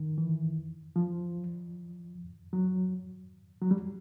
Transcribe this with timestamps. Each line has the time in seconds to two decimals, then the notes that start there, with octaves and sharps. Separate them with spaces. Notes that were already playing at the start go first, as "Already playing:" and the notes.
Already playing: D#3
0.18 E3
0.96 F3
2.53 F#3
3.62 F#3
3.71 G3